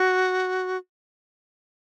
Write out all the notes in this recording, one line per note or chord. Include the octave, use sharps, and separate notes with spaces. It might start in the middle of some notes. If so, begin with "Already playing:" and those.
Already playing: F#4